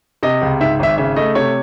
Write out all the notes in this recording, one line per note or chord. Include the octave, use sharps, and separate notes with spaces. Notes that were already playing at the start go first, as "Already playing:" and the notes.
C3 D#5
C#2
G#2 E5
G#1 E5
C#3 E5
A3 D#5
C3 C#5